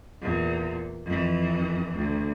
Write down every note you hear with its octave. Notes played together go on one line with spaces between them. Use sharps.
E2 A#2
F2 E3
D2